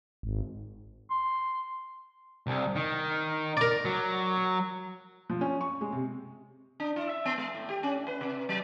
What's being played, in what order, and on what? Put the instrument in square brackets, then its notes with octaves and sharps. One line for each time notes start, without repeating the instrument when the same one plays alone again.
[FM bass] G#1
[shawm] C6
[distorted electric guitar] C2
D#3
[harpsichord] A#4 D5
[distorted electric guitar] F#3
[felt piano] F3
C#4
C#6
G#3
C3
[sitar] D4
E4
E5
B3
G#3
A2
G4
C#4
A2
B4
C3
F#3